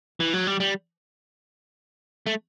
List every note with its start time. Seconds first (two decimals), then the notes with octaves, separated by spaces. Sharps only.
0.20 E3
0.34 F#3
0.47 G3
0.60 G3
2.26 A3